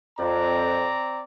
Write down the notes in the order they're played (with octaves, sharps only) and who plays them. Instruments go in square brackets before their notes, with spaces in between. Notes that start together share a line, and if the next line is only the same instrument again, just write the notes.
[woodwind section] F2 [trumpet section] C4 D5 A#5